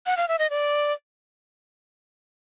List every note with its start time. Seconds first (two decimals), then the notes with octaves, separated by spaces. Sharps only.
0.06 F#5
0.17 F5
0.28 E5
0.39 D#5
0.50 D5